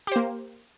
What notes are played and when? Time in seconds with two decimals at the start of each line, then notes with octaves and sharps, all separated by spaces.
0.07 G4
0.12 C5
0.16 A#3